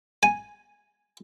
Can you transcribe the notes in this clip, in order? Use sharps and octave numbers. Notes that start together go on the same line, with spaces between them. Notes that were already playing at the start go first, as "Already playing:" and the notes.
G#5